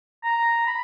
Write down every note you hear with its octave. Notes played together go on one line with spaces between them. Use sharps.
A#5
B5